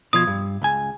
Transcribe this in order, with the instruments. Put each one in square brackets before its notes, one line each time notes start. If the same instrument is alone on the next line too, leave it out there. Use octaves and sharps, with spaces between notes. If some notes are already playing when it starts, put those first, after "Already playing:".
[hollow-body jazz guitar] B2 F3 [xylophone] D#6 G#6
[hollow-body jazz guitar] G2
C#2 G#5